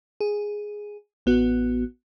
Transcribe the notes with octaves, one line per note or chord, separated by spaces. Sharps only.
G#4
A1 B3 F#4